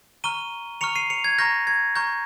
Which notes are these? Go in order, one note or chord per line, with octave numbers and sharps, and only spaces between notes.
A#5 C#6 F6 D#7 G7
A#5 C#6 F6 C#7 F7
C7 D#7
C#7 F7
G#6
A#5 C#6 F6 G6 A#6
G#6
A#5 C#6 F6 G6